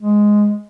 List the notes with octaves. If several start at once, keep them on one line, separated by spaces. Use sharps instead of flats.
G#3